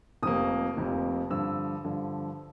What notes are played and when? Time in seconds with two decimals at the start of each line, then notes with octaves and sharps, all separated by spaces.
0.23 F1 F2 C3 F3 A#3 D#6
0.77 F1 F2 C3 F3 A#3
1.30 G2 D3 F3 E6
1.84 G2 D3 F3